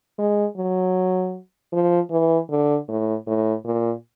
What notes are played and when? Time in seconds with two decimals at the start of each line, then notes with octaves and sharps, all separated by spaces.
0.19 G#3
0.57 F#3
1.73 F3
2.11 E3
2.50 D3
2.88 A2
3.27 A2
3.65 A#2